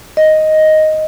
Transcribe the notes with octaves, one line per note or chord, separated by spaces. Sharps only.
D#5